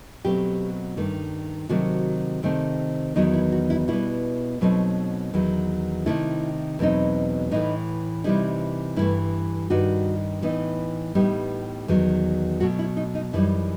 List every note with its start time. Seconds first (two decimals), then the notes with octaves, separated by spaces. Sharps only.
0.25 B2 F#3 A3 C4 G4
0.97 G2 D#3 A3
1.69 C3 D#3 F#3 A3 C4 F#4
2.43 C3 D#3 A3 C4
3.16 E2 D#3 F#3 B3 D#4
3.33 E4
3.52 F#4
3.70 E4
3.88 B2 G3 B3 E4
4.61 B2 F#3 A3 C4 D#4
5.34 E2 D#3 F#3
6.06 C3 D#3 A3 E4
6.79 E2 B2 F#3 C4 D#4
7.51 A2 E3 A3 D#4
8.24 C3 E3 G3 D#4 E4
8.96 G2 E3 A3 E4
9.70 G2 D#3 G3 D#4 F#4
10.42 A2 E3 B3 D#4
11.15 A2 G3 B3 D#4 G4
11.88 E2 D#3 F#3
12.60 B2 F#3 A3 F#4
12.79 E4
12.97 D#4
13.15 D#4
13.33 F#2 E3 G3 D#4 E4